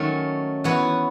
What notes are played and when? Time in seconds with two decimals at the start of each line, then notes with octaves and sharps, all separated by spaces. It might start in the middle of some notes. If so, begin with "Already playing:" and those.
Already playing: D#3 F#3 A3 C#4 D#4
0.64 E3 B3 F#4 C#5